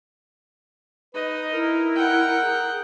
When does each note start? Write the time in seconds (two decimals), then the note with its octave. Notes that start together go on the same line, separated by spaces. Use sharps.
1.14 D#4 B4 D#5
1.53 E4 A#4
1.95 F#5 G5
2.42 G#4